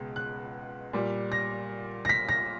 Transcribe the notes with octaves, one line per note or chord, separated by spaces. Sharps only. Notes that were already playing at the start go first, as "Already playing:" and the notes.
Already playing: C#2 B2 G#3
F#6
A#2 G3
A#6
A#6
B6
A#6